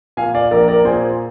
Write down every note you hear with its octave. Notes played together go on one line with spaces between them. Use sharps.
A#2 F5 G#5
D5 F5
A#1 A#4 D5
A#4 D5
A#2 G#4 C5